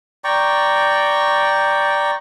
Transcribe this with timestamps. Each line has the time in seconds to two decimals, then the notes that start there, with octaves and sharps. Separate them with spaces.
0.24 D5 G5 A#5 C#6